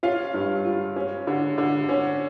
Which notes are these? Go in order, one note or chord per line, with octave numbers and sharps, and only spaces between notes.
C#4 F4 F5
G2
F4
C#4
D3
D3
C#4